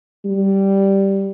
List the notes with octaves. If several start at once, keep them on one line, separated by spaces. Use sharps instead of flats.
G3